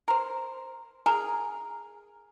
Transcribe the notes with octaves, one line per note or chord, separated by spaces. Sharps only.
A#4 C5
G#4 A#4